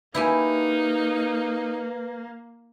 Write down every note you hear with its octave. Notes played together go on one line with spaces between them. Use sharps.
A#3 D#4 E4 G4 B4 G#5